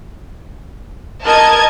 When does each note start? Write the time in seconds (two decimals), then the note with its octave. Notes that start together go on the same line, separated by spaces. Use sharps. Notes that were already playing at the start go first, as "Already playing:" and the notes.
1.25 A#4 D#5 A5 G#6